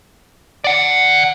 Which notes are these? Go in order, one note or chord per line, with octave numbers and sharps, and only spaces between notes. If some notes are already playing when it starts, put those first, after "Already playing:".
D5 F#5